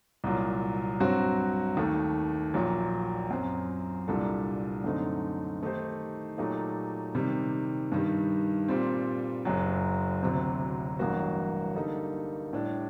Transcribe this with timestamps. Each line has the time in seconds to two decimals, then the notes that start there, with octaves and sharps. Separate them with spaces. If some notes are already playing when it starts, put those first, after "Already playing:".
0.24 C2 A#2 F#3
1.00 G2 F#3 C4 F#4
1.77 D#2 D#3 A3
2.54 A#1 A#2 F#3
3.31 F#2 F#3 C4
4.08 C2 A#2 G3 D4 A4
4.84 F#2 D3 A3 C4 D#4
5.61 D#3 A3 D#4 G4 C5
6.38 A#2 F#3 A3 D#4 G4
7.15 C3 D#3 G3
7.92 G2 D#3 G3
8.68 A#2 G3 C4
9.45 F#1 F#2 F#3
10.22 D2 C3 F#3 C4
10.99 A1 G2 F#3 A#3 F#4
11.76 D3 G3 A#3 D#4 A4
12.53 A2 G3 D4